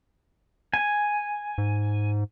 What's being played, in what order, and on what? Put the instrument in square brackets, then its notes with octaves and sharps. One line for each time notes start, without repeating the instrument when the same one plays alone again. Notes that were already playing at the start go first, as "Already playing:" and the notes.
[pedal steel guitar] G#5
[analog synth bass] G#2